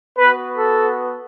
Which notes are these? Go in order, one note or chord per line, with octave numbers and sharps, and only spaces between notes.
B3 F#4 B4
A4